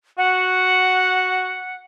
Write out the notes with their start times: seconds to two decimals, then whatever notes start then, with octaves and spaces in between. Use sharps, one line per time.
0.18 F#4 F#5